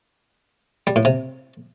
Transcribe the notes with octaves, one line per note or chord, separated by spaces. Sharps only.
G3
A2
C3